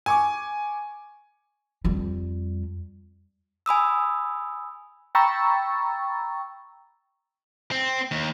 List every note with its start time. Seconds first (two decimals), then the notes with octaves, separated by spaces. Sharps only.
0.06 G#5 C#6 D6
1.85 F2 G3
3.66 G#5 B5 D#6 E6
5.15 G5 A#5 B5 C#6 E6 A6
7.71 C4
8.11 D#2